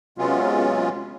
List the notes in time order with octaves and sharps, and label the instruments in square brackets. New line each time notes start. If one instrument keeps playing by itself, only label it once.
[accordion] C3 F#3 G#3 B3 C#4 F4